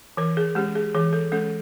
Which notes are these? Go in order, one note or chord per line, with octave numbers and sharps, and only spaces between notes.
E3 A#4
G#4
G#3 C#4 G4
G#4
E3 G#4
A4
G#3 C#4 A4